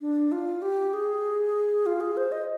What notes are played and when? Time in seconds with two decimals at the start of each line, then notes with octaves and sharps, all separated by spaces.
0.01 D4
0.32 F4
0.62 G4
0.93 G#4
1.86 F4
2.01 G#4
2.17 C5
2.32 D#5